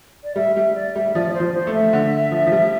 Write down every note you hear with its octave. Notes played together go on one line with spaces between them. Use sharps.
D5
G3 E5
G3 E5
D5
G3 E5
F3 D5
D5
C5
F3
C5
A3
E5
D3
F3
F3
G3